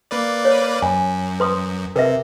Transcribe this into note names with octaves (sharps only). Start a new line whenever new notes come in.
A#3 B4 D5
C#5
F#2 G#5
B4 C6 D#6
C3 A#4 B4 E5